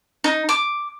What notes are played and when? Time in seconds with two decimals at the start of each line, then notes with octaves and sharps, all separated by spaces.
0.24 D#4
0.49 D6